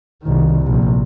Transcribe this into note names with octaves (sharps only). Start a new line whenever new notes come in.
C2 D#3
A#1 C3